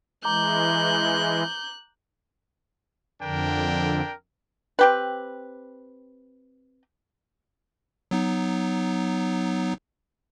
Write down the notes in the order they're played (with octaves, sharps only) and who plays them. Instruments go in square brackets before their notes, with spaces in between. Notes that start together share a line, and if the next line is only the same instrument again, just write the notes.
[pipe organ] E3 G#3 [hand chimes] A#5 D6 [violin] F#6 [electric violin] G6
[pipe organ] F2 D3 [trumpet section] D4 A#4 G5
[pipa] C4 G4 B4
[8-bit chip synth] F#3 B3 D#4